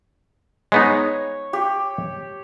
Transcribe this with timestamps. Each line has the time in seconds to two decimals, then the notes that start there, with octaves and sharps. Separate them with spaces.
0.72 G#3 B3 D#4 C#5
1.53 G4